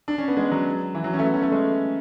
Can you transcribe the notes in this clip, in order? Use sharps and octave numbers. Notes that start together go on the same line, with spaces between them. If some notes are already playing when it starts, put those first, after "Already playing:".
D4
C#4
B3
G#3
F#3
E3
F#3
C#4
A3
B3
C#4
A3
G#3